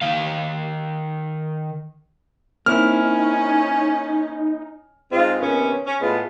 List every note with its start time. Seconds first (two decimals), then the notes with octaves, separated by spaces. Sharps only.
0.02 D#3 F5
2.66 A#3 C4 C#4 D#4 E4 F6
5.12 G#2 G#3 C4 F4
5.40 C3 D#3 B3 C#4
5.86 C#4
6.01 A2 G#3 B3 F4